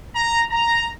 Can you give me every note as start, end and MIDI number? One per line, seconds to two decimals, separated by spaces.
0.15 0.42 82
0.50 0.89 82